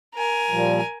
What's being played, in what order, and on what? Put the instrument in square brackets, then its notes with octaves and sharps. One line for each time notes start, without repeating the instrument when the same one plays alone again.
[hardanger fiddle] A#4 G#5
[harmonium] A#2 F3 G3